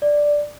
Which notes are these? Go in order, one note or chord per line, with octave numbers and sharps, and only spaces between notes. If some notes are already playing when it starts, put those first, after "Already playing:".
D5